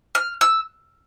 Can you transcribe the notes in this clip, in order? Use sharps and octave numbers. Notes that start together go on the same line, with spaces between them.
F6
E6